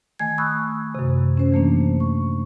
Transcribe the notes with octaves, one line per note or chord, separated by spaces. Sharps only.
D#3 A3 G#5 G#6
B5 C#6 D#6 E6 F#6
F#2 C3
C#4 C5
E3 A3 A#3 D4
C#6